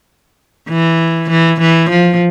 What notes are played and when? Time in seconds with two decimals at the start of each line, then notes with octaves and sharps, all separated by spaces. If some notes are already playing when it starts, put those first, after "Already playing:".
0.69 E3
1.31 E3
1.60 E3
1.90 F3